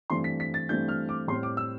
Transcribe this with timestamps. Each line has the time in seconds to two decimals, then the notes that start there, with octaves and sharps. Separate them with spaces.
0.10 G2 E3 A3 C4 C6
0.24 B6
0.40 B6
0.54 A6
0.69 G2 E3 A3 C4 G6
0.88 F6
1.09 D6
1.28 A2 G3 C4 C6
1.43 D6
1.57 E6